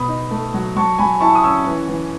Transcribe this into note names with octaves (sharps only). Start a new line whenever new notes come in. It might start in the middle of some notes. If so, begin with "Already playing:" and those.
Already playing: B2 B5 D#6
D#4
A3
F#3
F#3 A5 C#6
F#3 G#5 B5
E4 A5 C#6
D#6
C#4 C#6 E6
E3
E3